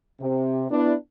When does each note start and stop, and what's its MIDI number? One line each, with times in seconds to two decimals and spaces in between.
0.20 0.66 48
0.71 0.94 59
0.71 0.94 62
0.71 0.94 64